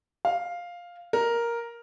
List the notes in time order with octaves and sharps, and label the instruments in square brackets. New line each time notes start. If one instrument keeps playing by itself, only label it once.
[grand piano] F5
A#4